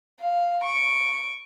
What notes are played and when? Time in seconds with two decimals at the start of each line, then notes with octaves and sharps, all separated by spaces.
0.21 F5
0.64 C#6 D7